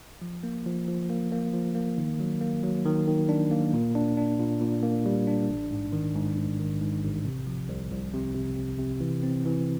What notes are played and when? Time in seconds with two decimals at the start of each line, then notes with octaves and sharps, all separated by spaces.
0.22 F3
0.43 A#3
0.66 F3
0.88 F3
1.10 A#3
1.32 A#3
1.53 F3
1.75 A#3
1.98 D#3
2.20 F#3
2.41 A#3
2.63 F#3
2.85 D#3
3.07 D#3
3.29 D4
3.51 A#3
3.73 A#2
3.95 D4
4.17 D4
4.39 A#2
4.61 A#2
4.83 A#3
5.06 G3
5.27 D4
5.49 A1
5.71 G#2
5.93 D#3
6.15 G#2
6.37 G#2
6.60 D#3
6.81 G#2
7.04 A1
7.25 C3
7.47 F3
7.69 C2
7.92 C2
8.13 C3
8.35 C3
8.57 C3
8.79 C3
9.01 E3
9.23 C4
9.45 E3